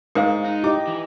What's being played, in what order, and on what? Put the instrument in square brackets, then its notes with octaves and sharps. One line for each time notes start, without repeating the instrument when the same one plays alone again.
[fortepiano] G#2 [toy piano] A#4 C5 F5
[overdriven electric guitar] D#4
[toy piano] E4 [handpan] G4 D#5 [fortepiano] D6
[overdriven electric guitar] E3